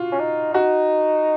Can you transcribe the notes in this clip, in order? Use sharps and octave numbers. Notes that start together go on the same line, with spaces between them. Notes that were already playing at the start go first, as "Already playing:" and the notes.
Already playing: F4 F#4
C#4
D#4
D#4 F#4